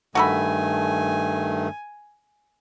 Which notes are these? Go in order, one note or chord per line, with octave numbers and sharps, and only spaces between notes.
G2 D#3 A3 F#4 A4 G#5 B5